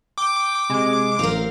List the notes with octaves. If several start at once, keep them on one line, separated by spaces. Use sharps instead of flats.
G5 D6
C3 G#3
A1 C4 A#4 F5